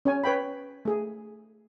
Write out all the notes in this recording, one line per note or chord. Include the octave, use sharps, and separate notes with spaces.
C#4 C#5 G#5
B4 C#5 G5 B5
A3 G#4